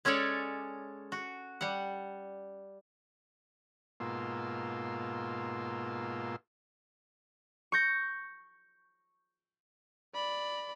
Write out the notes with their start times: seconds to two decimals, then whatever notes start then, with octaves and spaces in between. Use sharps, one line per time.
0.05 G#3 C#4 A4 C#5 D5
1.12 F#4
1.61 G3 F#5
4.00 G#2 B2 A#3 F4 C6 E6
7.72 C#6 G6 A#6
10.15 D5 B5